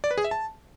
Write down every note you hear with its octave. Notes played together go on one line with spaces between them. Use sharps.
D5
B4
G#4
E5
A5